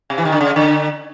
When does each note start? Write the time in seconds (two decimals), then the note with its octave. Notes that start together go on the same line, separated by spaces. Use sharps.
0.10 C3
0.18 E3
0.25 D#3
0.32 D3
0.41 C#3
0.56 D3